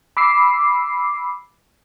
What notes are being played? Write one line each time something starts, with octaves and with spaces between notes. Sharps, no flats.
B5 D6 E6 C7